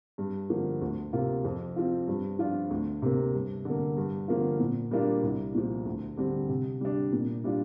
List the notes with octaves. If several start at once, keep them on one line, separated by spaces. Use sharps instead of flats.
G2
D3 F3 A#3
D2
C3 A#3 F4
F2
F3 C4 F4
G2
F3 D4 F4
D2
C3 A#3
G2
D3 A#3
G2
D3 F3 A#3 F4
A#2
G3 A#3 D4 F4
C2
A#2 F3
D2
D3 G3 C4
C3
G3 D4
A#2
G3 D4 F4